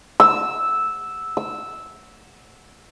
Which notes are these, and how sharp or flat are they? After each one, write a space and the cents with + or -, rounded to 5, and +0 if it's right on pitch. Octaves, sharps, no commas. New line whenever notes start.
E6 -5
E6 -5